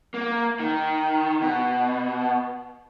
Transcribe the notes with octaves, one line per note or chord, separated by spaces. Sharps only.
A#3
D#3
B2